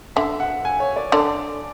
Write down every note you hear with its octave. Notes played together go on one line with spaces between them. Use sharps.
D3 E5
F#5
G#5
C#5
D5
D3 D5